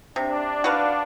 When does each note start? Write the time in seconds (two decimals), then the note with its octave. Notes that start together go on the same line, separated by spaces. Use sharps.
0.16 C3 D4
0.64 F#4 B4 F5